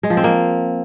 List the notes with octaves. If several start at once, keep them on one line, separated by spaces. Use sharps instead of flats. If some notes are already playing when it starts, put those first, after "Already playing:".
G#3
F3
C4
A#3